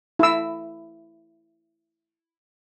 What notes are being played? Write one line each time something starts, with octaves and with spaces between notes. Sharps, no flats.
E4 E6